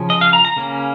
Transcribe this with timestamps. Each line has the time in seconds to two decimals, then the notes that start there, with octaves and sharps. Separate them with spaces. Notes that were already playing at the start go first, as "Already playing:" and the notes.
Already playing: C#3 F3 C#4
0.10 D#5
0.21 F5
0.33 A#5
0.45 A#5
0.56 C#3 A#3 C#4